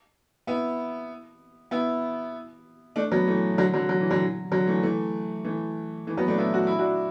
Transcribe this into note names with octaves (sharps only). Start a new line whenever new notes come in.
B3 E4
B3 E4
A3 D4
F#3 B3
E3 A3
D3 F#3
D3 F#3
F#3
E3
D3 F#3
D3 F#3
E3 A3
E3 A3
E3 A3
E3 A3
F#3 B3
A3 D4
B3 E4
F#4
E4
D4 F#4